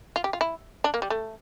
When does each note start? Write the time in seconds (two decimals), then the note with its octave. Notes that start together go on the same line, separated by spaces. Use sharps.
0.16 F4
0.24 G4
0.33 F4
0.41 E4
0.84 D4
0.94 A#3
1.02 G3
1.10 A3